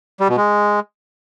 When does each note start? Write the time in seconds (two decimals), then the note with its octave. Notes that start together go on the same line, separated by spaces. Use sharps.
0.20 G3
0.29 B2
0.37 G#3